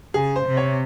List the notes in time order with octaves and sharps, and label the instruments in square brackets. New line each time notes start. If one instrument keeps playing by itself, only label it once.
[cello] C#3 [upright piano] G#4
[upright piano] C5
[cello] C3
[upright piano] C#5